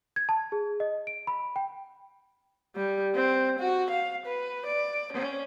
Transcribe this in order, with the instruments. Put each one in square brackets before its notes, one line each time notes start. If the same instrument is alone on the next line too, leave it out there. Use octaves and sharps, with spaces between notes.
[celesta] G#6
A5
G#4
D#5
D7
B5
G5
[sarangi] G3
C4
F#4
F5
B4
D5
C#4